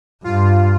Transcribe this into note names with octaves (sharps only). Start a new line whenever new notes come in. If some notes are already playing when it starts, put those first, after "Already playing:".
G2 F4